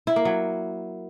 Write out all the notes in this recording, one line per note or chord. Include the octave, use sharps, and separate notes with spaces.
E4
A#3
F#3